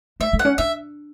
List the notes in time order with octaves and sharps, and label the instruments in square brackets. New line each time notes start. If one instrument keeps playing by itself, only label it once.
[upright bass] A3 [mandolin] E5
[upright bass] A3
[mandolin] F#5
[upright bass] C#4
[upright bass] D4 [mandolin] E5